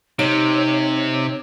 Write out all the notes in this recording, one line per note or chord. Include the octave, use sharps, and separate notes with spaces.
C3 D#4 C#5